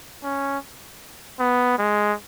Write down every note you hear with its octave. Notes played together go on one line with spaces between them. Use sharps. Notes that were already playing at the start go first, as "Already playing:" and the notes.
C#4
B3
G#3